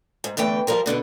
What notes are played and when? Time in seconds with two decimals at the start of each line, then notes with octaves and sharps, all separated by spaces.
0.24 G#2
0.37 E2 D3 E3 A3 G5
0.67 F3 G3 A#4 C5
0.86 B2 D3 B3 D4